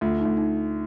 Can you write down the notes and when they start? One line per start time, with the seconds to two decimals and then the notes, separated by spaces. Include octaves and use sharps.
0.01 D2 F4
0.19 D#4
0.25 D2
0.37 D#4